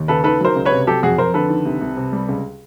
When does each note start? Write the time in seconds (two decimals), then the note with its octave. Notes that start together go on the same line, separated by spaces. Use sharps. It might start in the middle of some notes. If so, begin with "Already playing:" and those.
Already playing: D#2
0.08 C#3 A4 B4
0.24 D#3 A4 B4
0.40 F#3 A#4 C5
0.55 C#2
0.65 B4 C#5
0.72 C3
0.87 F#3 G4 A4
1.03 F2 F#4 G#4
1.18 F2 A#4 C5
1.34 D3 A4 B4
1.50 D#3
1.65 C2
1.81 C2
1.97 C3
2.12 G3
2.29 C#2